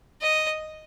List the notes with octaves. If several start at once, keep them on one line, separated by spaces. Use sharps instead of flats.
D#5